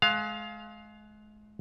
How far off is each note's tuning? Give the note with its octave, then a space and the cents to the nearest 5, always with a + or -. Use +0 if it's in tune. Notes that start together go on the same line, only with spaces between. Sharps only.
G#3 +35 F5 +5